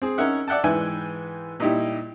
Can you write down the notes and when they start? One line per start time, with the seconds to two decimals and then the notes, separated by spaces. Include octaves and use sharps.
0.02 C4 G#4
0.18 C#4 D#4 A#4 E5 F#5
0.48 D5 E5 F#5 G5 A5
0.64 G#2 E3 B4 E5 G5 G#5
1.60 A#2 G3 D#4 E4 G4